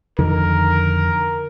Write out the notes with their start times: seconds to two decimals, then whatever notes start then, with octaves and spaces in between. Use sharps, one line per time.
0.19 F2 D3 D#3 A#4